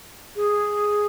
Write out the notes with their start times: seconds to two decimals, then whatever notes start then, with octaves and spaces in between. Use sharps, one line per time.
0.36 G#4